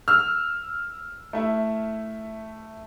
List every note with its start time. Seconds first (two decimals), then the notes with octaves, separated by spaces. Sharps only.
0.08 E6 F6
1.33 A3 E4